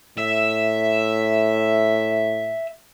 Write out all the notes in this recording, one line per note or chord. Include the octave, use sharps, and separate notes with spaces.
A2 E5